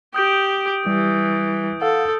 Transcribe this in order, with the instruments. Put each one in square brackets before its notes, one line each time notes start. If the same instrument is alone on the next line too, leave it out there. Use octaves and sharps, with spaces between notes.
[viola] G4 [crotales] D#6 G6 D7
[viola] E3 [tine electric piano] G3
[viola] A4 [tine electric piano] F5 F#5